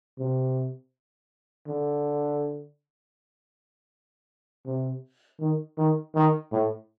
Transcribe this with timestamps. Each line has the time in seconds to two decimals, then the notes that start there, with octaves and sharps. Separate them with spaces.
0.19 C3
1.68 D3
4.66 C3
5.40 D#3
5.78 D#3
6.15 D#3
6.52 A2